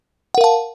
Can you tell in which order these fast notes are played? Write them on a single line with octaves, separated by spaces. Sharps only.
F#5 A#4 F5 A5